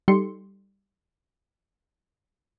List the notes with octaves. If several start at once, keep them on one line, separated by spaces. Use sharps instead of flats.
G3 D#4 G4 A4 C6 C#7